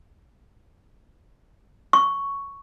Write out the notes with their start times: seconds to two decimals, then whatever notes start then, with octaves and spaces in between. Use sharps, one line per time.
1.93 C#6